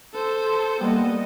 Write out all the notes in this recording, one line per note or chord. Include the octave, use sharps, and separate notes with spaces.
A4 C5
G3 A#3 B3 D#5